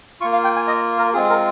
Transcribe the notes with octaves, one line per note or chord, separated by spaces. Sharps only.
A#3 F4 C#6
F5
G5
G#5
D#5
A#4
G#3 C4 F4 G#4
G#4
A#4